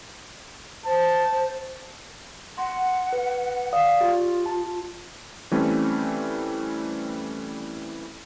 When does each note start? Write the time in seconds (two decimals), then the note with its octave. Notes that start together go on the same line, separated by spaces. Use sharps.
0.86 C5 A5
2.58 F#5 C6
3.12 B4
3.73 D5 F5 D#6
4.01 F4 G4
4.46 A5
5.51 E3 G3 A3 C4 C#4